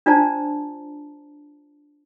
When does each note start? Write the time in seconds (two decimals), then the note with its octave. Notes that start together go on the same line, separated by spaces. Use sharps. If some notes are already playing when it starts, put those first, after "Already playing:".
0.06 D4 F4 C5 D5 A5 A#5